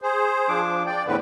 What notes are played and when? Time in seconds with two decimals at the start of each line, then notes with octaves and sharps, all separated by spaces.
0.02 G#4 C5
0.49 F3 D4 D6
0.86 D5 G5
1.07 E2 A2 D3 C4 B4